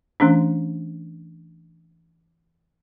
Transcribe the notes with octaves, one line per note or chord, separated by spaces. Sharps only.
E3 A3 C#4 D4